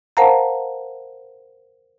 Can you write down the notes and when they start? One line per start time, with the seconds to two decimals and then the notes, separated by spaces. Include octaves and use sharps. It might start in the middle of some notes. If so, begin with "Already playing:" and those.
0.17 A#4 C5 F5 F#5 A5 A#5